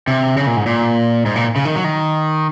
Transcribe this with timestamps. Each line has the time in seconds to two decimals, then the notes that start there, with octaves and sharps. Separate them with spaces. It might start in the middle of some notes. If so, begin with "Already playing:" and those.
0.08 C3
0.37 C#3
0.47 A#2
0.57 G#2
0.66 A#2
1.25 G#2
1.36 A#2
1.56 C#3
1.65 D#3
1.75 F#3
1.84 D#3